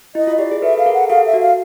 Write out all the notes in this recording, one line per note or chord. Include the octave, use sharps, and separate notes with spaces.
E4 D#5
F4
G4 D5
G#4
A4 B4 E5
A4 F5
G#4 A#4
F#5
G4 A4 F5
E5
F#4
F5